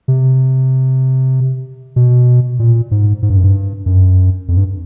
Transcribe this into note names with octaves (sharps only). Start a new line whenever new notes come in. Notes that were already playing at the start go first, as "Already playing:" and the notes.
C3
B2
A#2
G#2
G#2
G2
F#2
G2
F#2
F2
G2